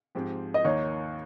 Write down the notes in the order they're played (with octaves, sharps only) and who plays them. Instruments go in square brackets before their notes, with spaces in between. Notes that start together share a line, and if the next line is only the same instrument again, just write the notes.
[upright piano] G#2 F3 C4 G4
[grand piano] D#5
[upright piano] D#2 D#3 A#3 D#4 [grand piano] C#5